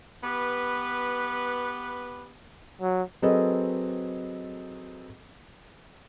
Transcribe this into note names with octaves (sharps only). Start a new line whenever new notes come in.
B3 G4 B4
F#3
F#3 C4 G#4 A4 B4 D#5